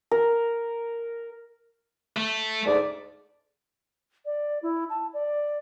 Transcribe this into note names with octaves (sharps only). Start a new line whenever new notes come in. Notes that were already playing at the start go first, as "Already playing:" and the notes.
A#4
A3
D2 G#2 D5
D5
E4
A5
D5